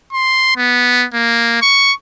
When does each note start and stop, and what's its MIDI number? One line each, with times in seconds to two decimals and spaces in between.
0.13 0.53 84
0.57 1.05 59
1.14 1.61 58
1.62 1.92 85